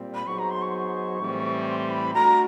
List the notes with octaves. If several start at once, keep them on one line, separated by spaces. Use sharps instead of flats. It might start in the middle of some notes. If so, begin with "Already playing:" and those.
Already playing: A#2 G3 C4
B5
F#3 B3 D#4 G#4 C5 C#6
A#5
C6
C#6
A2 E3 G3 C4
C6
B5
A3 D4 F#4 A#5